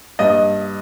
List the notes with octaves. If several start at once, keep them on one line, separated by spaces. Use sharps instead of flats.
G2 D#5